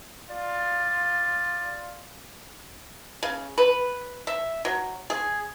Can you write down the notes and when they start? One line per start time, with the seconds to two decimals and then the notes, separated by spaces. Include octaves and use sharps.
0.30 F4 D5
3.23 C#3
3.58 B4
4.27 E5
4.65 F#3
5.10 G#4